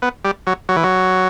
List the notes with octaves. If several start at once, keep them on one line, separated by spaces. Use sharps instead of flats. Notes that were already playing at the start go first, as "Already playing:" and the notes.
B3
G3
F#3
F#3
E3
F#3